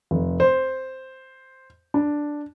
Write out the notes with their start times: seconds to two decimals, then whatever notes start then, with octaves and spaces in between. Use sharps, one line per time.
0.11 F1
0.40 C5
1.94 D4